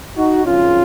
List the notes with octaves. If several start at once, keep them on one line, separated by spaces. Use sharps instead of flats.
D#4 F#4
G#1 F#2 C#3 F3 C#4 F4